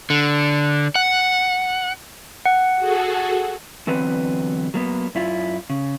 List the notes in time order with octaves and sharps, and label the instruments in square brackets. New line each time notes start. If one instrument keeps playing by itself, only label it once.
[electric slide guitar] D3
F#5
[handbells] F#5
[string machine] F#4 G#4 A4
[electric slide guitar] D3 E3 F#3 B3 C4 B4
F#3 A#3 B3
F#2 E4 F4
C#3